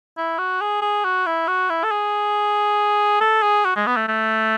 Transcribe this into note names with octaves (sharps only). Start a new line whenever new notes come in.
E4
F#4
G#4
G#4
F#4
E4
F#4
E4
A4
G#4
A4
G#4
F#4
G#3
B3
A3
A3